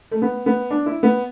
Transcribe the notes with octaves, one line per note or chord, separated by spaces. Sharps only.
A3
B3
B3
D4
E4
B3